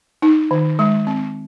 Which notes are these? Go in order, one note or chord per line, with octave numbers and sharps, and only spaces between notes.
D#4
D#3
G#3
C4